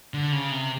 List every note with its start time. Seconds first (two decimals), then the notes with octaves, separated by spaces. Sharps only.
0.14 D3
0.32 C#3
0.51 C3